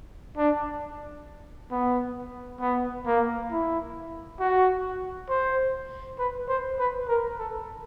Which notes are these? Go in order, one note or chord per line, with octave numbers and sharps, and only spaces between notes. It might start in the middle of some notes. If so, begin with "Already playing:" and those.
D4
B3
B3
A#3
E4
F#4
C5
B4
C5
B4
A#4
A4